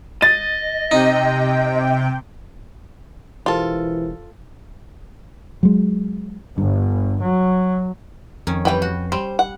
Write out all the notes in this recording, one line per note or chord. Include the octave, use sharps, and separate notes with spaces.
D#5 A6
C3 D#4 G5
E1 E3 F4 G4 A4 A#4 C5
F#3 G#3
G1 G2
F#3
F2 D#3 C#4
E3 G3 B4 G5
F#4
G3 C5
F#5